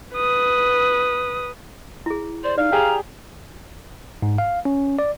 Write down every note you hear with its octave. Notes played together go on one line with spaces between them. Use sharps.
B4 D#6
E4 G#4
C5 D5
D#4 D5 F5
G4 G#4 A#5
G#2
F5
C#4
D5